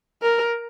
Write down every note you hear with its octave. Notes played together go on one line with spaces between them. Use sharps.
A#4